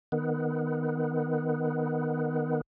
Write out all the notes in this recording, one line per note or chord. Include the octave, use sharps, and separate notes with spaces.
D#3 B3